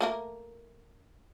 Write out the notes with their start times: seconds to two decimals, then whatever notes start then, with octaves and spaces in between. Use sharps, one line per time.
0.01 A3 A#3 A#4